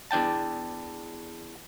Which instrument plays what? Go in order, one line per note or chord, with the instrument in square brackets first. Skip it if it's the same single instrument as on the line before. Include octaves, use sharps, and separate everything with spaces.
[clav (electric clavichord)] E2 D4 G5 A5